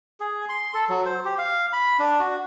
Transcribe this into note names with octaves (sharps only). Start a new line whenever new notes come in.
G#4
C6
A4
F#3
C5
G4
F5
B5
D4
F#4